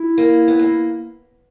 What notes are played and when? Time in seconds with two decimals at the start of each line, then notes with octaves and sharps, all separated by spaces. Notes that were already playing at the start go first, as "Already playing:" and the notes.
Already playing: E4
0.18 A#3
0.48 B3
0.59 A#3